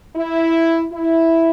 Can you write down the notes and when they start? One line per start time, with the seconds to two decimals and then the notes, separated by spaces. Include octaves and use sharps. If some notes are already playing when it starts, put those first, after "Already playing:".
0.16 E4
0.92 E4